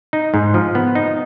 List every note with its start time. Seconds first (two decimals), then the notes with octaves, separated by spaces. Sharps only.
0.13 D#4
0.34 G#2
0.54 F3
0.75 B3
0.95 D#4